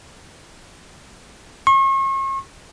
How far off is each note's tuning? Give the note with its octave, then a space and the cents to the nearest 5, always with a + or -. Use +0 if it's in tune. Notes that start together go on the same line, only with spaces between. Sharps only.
C#6 -40